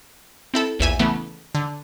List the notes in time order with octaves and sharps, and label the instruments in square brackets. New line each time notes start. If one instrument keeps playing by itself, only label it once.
[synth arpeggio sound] C4 E4 A4
A#1 E2 E5 G#5
C#3 E3 A3 B3
D3